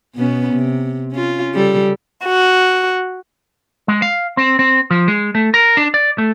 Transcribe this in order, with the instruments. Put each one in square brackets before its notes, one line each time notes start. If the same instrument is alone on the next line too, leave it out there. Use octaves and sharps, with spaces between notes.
[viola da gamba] B2 B3 C#4
C3
C#4 F4
C#3 G3 A4
[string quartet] F#4
[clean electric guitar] G#3
F5
C4
C4
F3
G#3
A3
A#4
D4
D5
A3